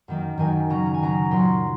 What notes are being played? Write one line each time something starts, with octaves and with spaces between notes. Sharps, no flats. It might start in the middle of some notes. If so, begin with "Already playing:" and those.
F#2 D#3 A#3 D#4
F#2 D#3 A#3 D#4 G#5
C#3 F#3 C#4 A#5
A#5
G#5
C#3 F#3 C#4 A#5
A#2 F#3 C#4 C6